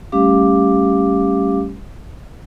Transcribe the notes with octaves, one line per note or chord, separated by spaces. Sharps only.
G3 A3 C#4 G4 F5 D6